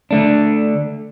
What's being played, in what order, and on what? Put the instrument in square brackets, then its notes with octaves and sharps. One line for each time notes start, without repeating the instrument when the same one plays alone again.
[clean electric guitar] D3 A3 D4